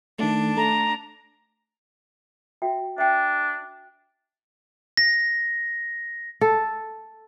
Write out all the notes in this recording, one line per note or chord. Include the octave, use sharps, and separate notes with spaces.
D#3 A3 D4
A3 A#5
F#4 E5 G5
D4 E5 G5
A#6
A4